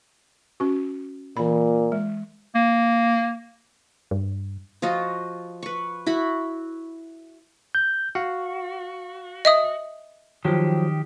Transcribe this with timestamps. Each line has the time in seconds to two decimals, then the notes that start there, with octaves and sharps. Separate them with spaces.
0.60 C#4 F#4
1.37 A#2 E3 B5
1.92 G#3
2.55 A#3
4.11 G2
4.82 F3 F4 F#4 D#5
5.63 B4 C#6
6.06 E4 F#4 B5
7.75 G6
8.15 F#4 F5
9.45 D#5 E5 D#6
10.45 D#3 F3 F#3 G4